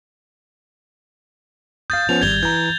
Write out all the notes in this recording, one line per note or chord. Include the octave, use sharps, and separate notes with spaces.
F5 D#6 G6 A6
F3 B3 C#4 F7
G#1 G3 G#6 F7 G7
E3 A#5 G6